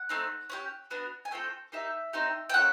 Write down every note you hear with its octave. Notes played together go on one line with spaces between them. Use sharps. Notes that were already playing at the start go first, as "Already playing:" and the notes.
Already playing: F#5
A3 C4 D#4
C#4 E4 G4
B3 D4 F#4
G#5
A3 C4 F4 A4 G5
A#3 D#4 G4 E5
C4 D#4 G4
G5
A#3 C#4 F4 A4 F#5